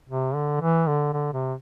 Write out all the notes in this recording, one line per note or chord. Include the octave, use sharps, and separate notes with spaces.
C3
D3
E3
D3
D3
C3